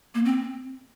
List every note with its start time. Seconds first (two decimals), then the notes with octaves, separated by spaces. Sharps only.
0.15 A#3
0.25 C4